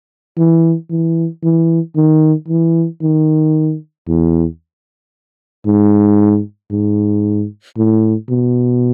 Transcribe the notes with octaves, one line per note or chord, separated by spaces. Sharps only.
E3
E3
E3
D#3
E3
D#3
E2
G#2
G#2
A2
B2